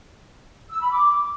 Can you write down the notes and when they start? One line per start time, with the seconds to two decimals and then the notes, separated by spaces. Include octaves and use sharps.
0.70 E6
0.81 B5
0.92 D6